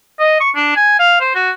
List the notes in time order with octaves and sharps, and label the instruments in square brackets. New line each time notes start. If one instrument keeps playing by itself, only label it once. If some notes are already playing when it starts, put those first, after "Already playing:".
[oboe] D#5
C#6
D4
G#5
F5
C5
F#4